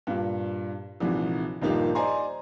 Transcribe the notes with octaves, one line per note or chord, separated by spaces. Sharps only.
G2 A#2
A#1 G#2 C3 E3
D#1 G2 F3 A#3 D#4 G4
C5 D5 D#5 G#5 A#5 C6